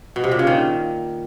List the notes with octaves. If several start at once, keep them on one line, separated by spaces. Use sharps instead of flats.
B2
C3
A#2
C#3
D#3